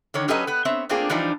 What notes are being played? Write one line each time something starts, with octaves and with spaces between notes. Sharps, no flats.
D3 D#3 C#5
F#3 C#4 G4 A4 B4 D#5
B3 B4
B3 C4 C#5 E5
A3 A#3 C4 D4 F4 G#4
E3 F3 G3 D4 D#4